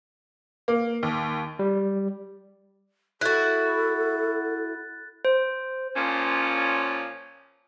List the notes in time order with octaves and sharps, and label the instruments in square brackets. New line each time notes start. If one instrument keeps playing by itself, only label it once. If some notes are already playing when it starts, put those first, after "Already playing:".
[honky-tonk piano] A#3
D#2
[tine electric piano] G3
[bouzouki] E4 F#4 [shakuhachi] A4 [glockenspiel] F#6 A6
[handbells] C5
[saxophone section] A#2 F3 C#4